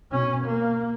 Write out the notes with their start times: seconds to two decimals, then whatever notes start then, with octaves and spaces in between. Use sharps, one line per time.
0.11 B2 C#4
0.45 A#3